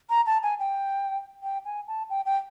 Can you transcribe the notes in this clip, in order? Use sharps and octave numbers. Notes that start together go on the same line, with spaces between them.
A#5
A5
G#5
G5
G5
G#5
A5
G5
G5